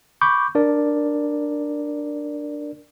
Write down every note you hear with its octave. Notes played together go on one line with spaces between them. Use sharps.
B5 C#6 D6 G6
D4 A#4 D5